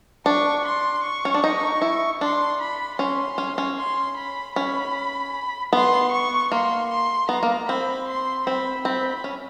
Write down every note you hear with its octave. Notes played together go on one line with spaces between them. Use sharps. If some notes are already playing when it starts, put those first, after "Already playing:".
D4 C#6
C6
C#6
C#4
D4
D#4
E4
D4 C6
B5
C#4 C6
C#4
C#4
C6
B5
C#4 B5
B3 C6
C#6
A#3 C6
C6
B3 A#5
A#3
C4 B5
C6
C4 B5
C4 B5
C#4